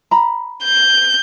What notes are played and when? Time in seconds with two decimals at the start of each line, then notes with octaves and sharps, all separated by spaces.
0.11 A#5 B5
0.65 G6